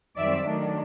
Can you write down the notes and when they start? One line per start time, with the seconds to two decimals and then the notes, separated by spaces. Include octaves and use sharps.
0.16 F#2 D#3 G3 C4 D5 E5
0.45 D#3 F#3 A3 D4